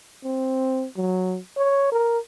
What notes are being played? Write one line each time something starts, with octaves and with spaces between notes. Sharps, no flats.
C4
F#3
C#5
A#4